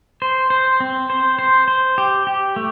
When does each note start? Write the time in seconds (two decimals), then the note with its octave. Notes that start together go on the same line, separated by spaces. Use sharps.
0.22 C5
0.50 C5
0.80 C4
1.10 C5
1.39 C5
1.68 C5
1.98 G4
2.27 G4
2.56 A3